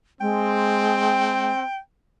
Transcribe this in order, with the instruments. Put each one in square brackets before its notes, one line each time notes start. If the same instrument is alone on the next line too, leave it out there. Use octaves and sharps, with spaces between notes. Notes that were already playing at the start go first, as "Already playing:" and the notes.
[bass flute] G#3 [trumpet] C4 [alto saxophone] G5